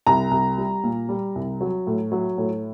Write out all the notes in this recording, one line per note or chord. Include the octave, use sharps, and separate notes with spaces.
C2 A#5
C2
G3
A#2
G3
C2
F#3
A2
F#3
A2